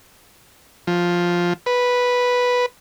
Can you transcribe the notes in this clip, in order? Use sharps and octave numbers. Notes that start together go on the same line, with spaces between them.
F3
B4